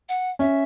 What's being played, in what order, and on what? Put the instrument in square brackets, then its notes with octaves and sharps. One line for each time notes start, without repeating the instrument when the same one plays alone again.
[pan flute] F#5
[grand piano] C#4 [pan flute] E5